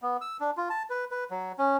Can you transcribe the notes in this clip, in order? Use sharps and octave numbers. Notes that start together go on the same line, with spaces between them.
B3
E6
D4
F4
A5
B4
B4
F#3
C#4